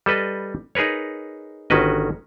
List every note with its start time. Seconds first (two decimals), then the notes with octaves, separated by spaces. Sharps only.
0.06 G3 A4 B4 D#5
0.75 D#4 G#4 A#4 B4 C#5
1.70 G1 D#3 C#4 F#4 B4 D#5